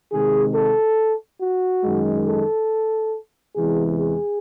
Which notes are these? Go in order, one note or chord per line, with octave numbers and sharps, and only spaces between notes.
C3 D#3 G#3 G#4
A4
F#4
F#2 D#3 G#3
A4
E2 C3 E3 G#3 G#4
G#4